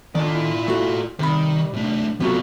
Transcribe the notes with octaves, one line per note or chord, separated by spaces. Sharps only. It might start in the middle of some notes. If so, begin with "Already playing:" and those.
D3 D#3 D4 F4 D5
E4
A3 F#4
C3 D#3 G3 B5
B1 A3 D4
C3 F#3 A3 B3 F4 F#4